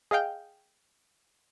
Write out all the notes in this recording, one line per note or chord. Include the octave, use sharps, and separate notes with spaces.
G#4 D#5 F5 G5